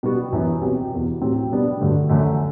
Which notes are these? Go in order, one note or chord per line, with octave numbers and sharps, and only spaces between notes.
B2 G3 B3 F#4
F#2 E3 B3
B2 F#3 C4 G4
E2 B2 F#3
A2 F#3 C4 G4
B2 G3 B3 D4
G2 D3 F#3 A3
F#2 D3 A3